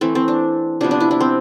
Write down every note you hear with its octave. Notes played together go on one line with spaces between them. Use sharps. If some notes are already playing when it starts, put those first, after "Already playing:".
E3 A3 C4
C4
D4
C3 F3 B3 D4
D4
E4
D4
C4